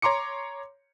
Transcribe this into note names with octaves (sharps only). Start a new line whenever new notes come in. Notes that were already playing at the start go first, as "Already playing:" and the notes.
C#5 A#5 C6 D6 C#7